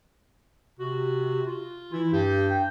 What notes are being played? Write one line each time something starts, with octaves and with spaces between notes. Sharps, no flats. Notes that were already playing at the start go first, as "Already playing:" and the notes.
C3 F#4
F4
E3 E4
G2 G4
G5